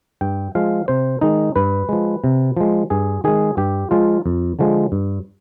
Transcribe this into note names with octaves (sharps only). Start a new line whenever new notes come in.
G2 G5
F3 G#3 F5
C3 C5
D#3 G#3 D#4
G2 B4
F3 G#3
C3
F3 G#3
G2 G#4
D#3 G#3 G#4
G2 G4
F3 G#3 F4
F2
D3 F3 G#3
G2